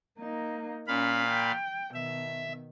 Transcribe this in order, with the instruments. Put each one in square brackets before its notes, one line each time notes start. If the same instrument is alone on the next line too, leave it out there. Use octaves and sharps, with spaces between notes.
[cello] A#3 D#4
[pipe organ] A#2 F5 B5 [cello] C#4
[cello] G5
[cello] B2 D#3 [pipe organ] E5